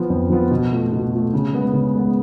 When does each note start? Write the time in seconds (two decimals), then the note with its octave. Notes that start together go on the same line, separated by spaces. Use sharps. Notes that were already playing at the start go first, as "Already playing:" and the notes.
Already playing: F3 B3 F4
0.10 F2
0.30 F3 B3 F4
0.51 B2
0.72 A3 F4
0.92 B2
1.13 A3 F4
1.33 C#3
1.53 G#3 B3
1.74 C#3
1.95 G#3 B3